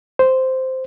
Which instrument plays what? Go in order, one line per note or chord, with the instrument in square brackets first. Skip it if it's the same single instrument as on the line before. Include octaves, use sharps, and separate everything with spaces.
[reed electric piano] C5